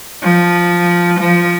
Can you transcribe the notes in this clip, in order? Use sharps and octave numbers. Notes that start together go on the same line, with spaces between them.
F3
F3